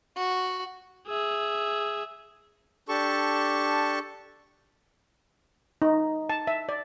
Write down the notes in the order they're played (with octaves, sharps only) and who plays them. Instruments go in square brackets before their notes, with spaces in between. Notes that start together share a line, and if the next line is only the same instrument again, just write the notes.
[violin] F#4
[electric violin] G#4 E5
[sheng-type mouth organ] D4 G4 A4 A5 C#6
[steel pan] D#4
A5
E5
D5